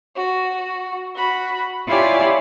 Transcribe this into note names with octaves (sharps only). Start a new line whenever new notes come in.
F#4
F#4 B5
E4 F4 G4 C#5 D5 G#5